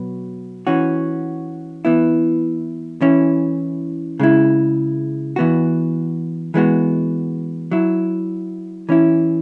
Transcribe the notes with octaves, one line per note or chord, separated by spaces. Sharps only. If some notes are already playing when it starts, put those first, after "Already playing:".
Already playing: B2 F#3 B3
E3 C#4 F#4
E3 B3 E4
E3 C#4 E4
C#3 G#3 E4
E3 B3 F#4
E3 G#3 B3 F#4
F#3 E4
E3 C#4 E4